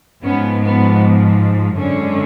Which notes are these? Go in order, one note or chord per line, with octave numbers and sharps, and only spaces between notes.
G#2 F3 B3 C#4
B3
F#2 D3 G#3 C#4